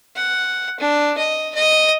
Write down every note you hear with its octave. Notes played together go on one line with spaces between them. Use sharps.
F#5
D4
D#5
D#5